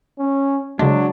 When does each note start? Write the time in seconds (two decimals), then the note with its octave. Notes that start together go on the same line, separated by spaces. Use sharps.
0.19 C#4
0.79 C#3 F#3 G#3 D4